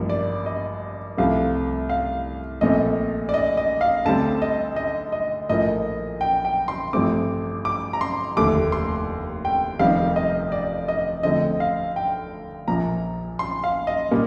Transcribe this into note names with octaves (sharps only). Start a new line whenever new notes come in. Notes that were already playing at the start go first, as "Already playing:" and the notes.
Already playing: A1 G2 F3 A#3
D5
D#5
C2 C3 F3 A3 F5
F5
A#1 A#2 A3 C4 D#5
D5
D#5
D#5
F5
D2 D3 G3 C4 A5
D#5
D#5
D#5
A#1 A2 F3 A#3 D#5
G5
G5
C6
A1 G2 F3 A3 C4 D6
D6
A#5
C6
F1 D#2 D3 A3 D6
C6
G5
F1 F2 D#3 G3 C4 F5
D#5
D5
D#5
D2 D3 F3 C4 D#5
F5
G5
A#1 A#2 F3 A#5
C6
F5
D#5
A#2 G3 A#3